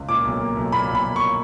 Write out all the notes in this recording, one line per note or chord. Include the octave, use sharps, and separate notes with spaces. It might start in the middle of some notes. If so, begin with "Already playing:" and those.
Already playing: C#2
A#2 D6
B1
A#3
B1
A#2 B5
B1
B5
A#3
C#6